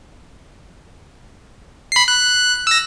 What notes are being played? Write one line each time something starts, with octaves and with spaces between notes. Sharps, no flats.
B5 C7
F#6
E6 A#6